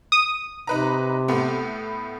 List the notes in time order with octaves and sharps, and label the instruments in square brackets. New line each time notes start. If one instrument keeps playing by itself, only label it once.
[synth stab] D#6
[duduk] C3 [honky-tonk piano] D#4 B4 A#5
[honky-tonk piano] A2 B3